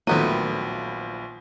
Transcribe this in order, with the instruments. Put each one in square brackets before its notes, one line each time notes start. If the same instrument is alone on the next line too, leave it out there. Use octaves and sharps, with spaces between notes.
[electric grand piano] A#1 F3 D#7 [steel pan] D#3 A3 [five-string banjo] F#3 B3 C4